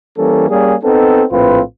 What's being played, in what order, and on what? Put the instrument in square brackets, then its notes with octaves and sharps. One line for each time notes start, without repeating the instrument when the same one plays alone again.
[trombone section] E3 G3 A#3 C#4 A4
G3 A#3 C#4 G#4
B3 C4 D#4 A4
A#1 A2 C4 F4 B4